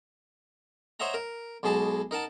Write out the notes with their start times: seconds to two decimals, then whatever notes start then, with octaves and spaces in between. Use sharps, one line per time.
1.00 C5 C#5 D#5 E5 F#5 A#5
1.14 A#4
1.63 B1 B2 G#3 G#4 A5
2.11 D#4 A#4 F#5 A5